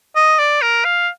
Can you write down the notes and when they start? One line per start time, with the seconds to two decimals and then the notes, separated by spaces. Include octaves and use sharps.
0.16 D#5
0.39 D5
0.62 A#4
0.85 F5